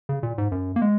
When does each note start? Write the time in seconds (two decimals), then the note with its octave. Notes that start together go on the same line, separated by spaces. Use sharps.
0.09 C#3
0.23 A#2
0.38 G#2
0.52 F#2
0.76 A#3
0.82 G#3